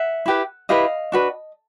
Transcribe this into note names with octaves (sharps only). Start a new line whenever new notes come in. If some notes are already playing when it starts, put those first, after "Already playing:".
Already playing: E5 F#5
E4 G4 B4
E4 G4 B4 D#5 F5
D4 F#4 B4